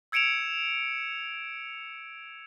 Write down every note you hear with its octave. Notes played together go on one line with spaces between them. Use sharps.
E6 G#6 C#7 D7 E7 F7